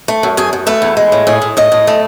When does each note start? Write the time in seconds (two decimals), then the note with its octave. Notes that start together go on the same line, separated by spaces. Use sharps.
0.08 A3
0.23 F#2
0.37 F#2 G#4
0.53 F#2
0.67 A3 B4
0.82 E2
0.97 G#3
1.12 A2
1.27 A2 G#4
1.42 A2
1.57 A2 D#5
1.72 A2
1.87 A3